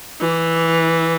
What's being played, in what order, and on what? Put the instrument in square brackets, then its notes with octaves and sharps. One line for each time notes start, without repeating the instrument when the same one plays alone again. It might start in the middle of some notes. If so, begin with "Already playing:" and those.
[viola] E3